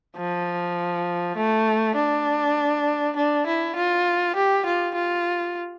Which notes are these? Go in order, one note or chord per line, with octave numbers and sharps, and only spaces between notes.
F3
A3
D4
D4
E4
F4
G4
F4
F4